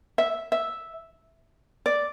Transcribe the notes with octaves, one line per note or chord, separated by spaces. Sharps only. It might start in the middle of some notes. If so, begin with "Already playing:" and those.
E5
E5
D5